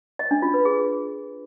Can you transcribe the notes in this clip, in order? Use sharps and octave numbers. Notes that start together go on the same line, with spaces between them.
D#5
D4
F4
B4
G#4